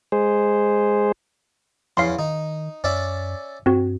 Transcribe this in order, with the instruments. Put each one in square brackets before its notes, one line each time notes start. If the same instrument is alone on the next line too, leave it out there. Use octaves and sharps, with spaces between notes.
[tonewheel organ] G#3 G#4 C5
[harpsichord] E2 C#4 [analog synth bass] F3 [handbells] F5 C6
[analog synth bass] D#3 [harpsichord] D#4
[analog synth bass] F#2 [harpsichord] C#4 D5 E5
[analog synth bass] G2 [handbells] C4 F#4